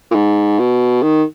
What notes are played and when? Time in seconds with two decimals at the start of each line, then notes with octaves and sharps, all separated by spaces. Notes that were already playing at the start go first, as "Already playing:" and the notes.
0.11 A#2
0.15 G#2
0.59 B2
1.03 D#3